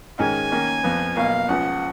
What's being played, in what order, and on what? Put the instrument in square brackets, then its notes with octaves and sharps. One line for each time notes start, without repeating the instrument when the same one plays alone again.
[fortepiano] G#2 D#3 G#3 C#4 [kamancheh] G#5
[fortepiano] D#3 A#3 C#4
F2 F3 B3
[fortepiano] B1 B2 A#3 [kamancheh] F5
[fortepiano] C#2 C#3 F3 [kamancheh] F#5